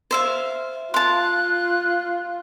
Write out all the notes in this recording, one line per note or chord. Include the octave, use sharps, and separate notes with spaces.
C5 E5 F5
F4 F5 A5 C6 F#6